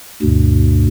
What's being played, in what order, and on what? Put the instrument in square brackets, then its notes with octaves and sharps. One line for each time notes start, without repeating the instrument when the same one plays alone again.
[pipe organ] D2 G2 B2